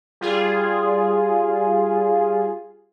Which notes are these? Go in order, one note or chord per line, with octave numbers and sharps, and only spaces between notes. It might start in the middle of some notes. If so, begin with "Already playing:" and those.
G3 F4 G#4